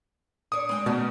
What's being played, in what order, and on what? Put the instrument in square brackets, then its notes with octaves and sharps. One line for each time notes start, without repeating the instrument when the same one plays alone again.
[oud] D4 C#5 [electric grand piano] D#6
[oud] G#3 C4
[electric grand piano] B2 [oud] D#3 A3 C#4